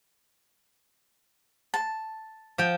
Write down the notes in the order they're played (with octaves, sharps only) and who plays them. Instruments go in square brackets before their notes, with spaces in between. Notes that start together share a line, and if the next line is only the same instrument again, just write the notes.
[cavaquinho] A5
[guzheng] F3 G5